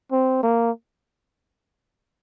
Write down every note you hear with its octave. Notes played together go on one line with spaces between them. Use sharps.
C4
A#3